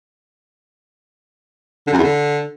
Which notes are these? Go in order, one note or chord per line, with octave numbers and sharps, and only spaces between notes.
D3
F#2
E2
D3